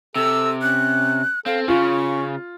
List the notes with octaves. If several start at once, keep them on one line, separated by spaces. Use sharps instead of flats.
C3 A4 E6
C#4 F#6
C4 A4 F5
C#3 C#4 F4 C#6